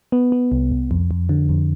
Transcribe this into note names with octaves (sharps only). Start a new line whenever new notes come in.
B3
B3
C2
C2
F2
F2
D3
F2